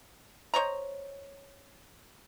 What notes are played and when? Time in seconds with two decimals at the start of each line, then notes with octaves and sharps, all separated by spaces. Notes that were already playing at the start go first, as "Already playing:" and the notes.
0.54 C5 C#5 D#5 A#5